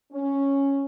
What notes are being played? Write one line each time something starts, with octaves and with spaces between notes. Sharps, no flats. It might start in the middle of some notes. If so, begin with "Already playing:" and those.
C#4